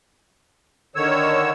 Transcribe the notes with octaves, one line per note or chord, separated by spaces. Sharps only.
D3 D#3 C#5 E6